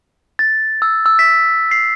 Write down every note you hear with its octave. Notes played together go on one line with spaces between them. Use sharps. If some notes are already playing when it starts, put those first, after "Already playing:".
A6
E6
E6
B6
C7